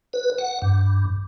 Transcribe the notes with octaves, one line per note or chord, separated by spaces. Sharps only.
B4
F#5
G2